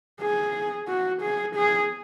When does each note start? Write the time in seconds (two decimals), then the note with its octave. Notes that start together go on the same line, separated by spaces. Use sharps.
0.21 G#4
0.88 F#4
1.22 G#4
1.56 G#4